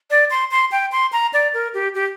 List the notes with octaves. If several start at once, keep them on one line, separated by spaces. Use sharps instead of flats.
D5
C6
C6
G5
C6
A#5
D5
A#4
G4
G4